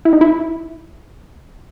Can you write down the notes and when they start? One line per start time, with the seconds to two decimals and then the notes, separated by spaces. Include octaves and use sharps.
0.05 E4
0.13 D#4
0.21 E4